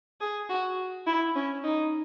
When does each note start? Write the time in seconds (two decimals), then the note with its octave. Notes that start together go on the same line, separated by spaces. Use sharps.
0.21 G#4
0.49 F#4
1.07 E4
1.35 C#4
1.64 D#4